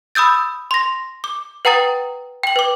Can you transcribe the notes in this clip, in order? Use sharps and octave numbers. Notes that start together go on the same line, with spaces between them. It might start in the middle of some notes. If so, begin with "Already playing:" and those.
B5 D#6 E6 G6 A6
C6 A#6
D6
B4 F#5 G5 A#5 D#6 A6
G5 F#7
B4 D6